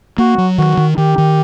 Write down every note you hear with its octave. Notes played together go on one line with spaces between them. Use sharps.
A#3 F#4
F#3
D#3 F#4
D#3
D#3 G4
D#3